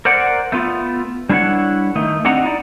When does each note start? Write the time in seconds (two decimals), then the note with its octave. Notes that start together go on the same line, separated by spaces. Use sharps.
0.05 A#4 C5 D5 F#5
0.52 A3 B3 F4
1.29 G3 D4 E4 B4 C#5 F#5
1.95 D#3 A3 D#4
2.25 C4 D4 G4 D#5 F#5 A#5
2.44 D#4 E4 D5